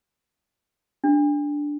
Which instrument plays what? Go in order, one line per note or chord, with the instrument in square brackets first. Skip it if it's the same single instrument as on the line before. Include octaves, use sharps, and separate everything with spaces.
[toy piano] D4